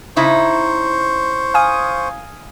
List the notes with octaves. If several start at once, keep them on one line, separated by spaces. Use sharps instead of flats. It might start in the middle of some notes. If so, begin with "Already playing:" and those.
C#3 D#4 E4 C5 C#6
F5 G#5 D#6